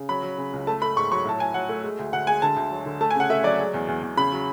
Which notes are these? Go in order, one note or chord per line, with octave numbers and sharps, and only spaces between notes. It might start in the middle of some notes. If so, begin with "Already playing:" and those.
Already playing: C#3
F#3 B5
F#3
C#3
C#2
A3 A5
A3 B5
G#2 C#6
F#3 C#6
A2 A5
A2 G#5
F#3 F#5
A3
G#3
D2
D2 F#5
G#3 G#5
D3 A5
D2
F#3
D3
A3 A5
G#5
C#3 F#5
A3 E5
F#3 D5
G#3
E2
E2
E2
C#3 B5
F#3